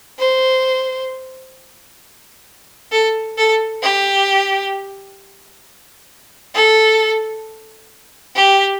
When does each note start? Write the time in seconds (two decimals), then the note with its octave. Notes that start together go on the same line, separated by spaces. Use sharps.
0.19 C5
2.92 A4
3.37 A4
3.82 G4
6.55 A4
8.35 G4